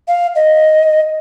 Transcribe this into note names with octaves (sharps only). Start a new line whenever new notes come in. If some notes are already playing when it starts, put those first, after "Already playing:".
F5
D#5